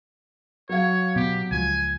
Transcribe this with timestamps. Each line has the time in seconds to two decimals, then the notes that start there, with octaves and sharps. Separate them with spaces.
0.69 F#3 C#5 F5
1.16 B2 B3 G4
1.51 C#2 F3 G#5